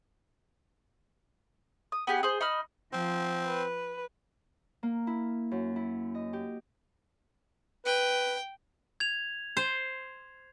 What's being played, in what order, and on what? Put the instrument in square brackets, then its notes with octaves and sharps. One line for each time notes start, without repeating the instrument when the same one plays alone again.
[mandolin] D#6
B3 G4 G#4
G#4 C5
D#4 B5 F6
[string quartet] F3 [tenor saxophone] C4
[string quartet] B4
[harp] A#3
E4
F#2
E4
D#5
G4
[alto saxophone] B4 [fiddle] G5
[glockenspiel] G#6 F7
[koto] C5